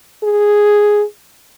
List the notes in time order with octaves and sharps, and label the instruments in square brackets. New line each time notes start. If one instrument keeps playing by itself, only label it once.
[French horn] G#4